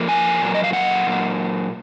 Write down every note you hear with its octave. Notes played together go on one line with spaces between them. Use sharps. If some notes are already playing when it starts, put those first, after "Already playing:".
Already playing: F2 F3 A#3
G#5
A#2 F#3 A#3
D#5
F5
F#5
A#2 F#3 A#3